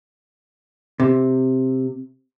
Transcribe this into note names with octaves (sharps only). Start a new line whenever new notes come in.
C3